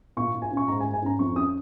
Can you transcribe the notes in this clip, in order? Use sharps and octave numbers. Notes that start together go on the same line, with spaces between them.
A#2 C#6
A#2
G#5
C#4
C#6
G#2 A#5
G#5
G#2
G#5
C#4 A#5
F2 C#6
C#4 D#6